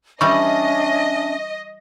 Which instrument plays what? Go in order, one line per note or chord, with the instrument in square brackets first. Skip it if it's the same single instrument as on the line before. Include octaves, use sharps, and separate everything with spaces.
[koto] E3 G3 [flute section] C#4 D4 E5 [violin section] D#5 [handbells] C#6